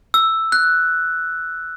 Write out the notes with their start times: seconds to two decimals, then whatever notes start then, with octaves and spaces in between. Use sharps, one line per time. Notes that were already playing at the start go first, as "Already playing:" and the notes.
0.14 E6
0.52 F#6